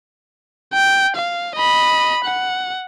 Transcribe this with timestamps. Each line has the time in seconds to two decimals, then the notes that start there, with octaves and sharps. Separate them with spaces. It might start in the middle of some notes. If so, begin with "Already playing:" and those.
0.73 G5
1.16 F5
1.56 D#5 B5
2.24 F#5